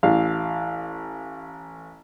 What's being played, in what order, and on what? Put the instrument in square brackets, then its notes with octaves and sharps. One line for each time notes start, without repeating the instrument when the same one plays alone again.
[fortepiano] A1 F5